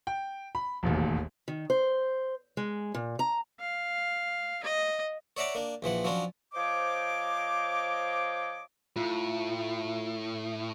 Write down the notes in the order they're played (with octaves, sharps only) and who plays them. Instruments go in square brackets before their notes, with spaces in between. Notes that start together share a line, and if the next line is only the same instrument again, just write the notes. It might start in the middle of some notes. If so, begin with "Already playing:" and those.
[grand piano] G5
B5
E1 A1 D#2
[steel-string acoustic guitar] D#3
C5
G#3
A#2
A#5
[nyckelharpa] F5
D#5
[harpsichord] C#5 D5 E5 F#5 A#5 D6
A#3 D4
A#1 E3 F3 F#5
F3 F#3 C#4 D4 F4
[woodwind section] F3 C5 C#5 D#5 D6
[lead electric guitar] A2 [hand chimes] F4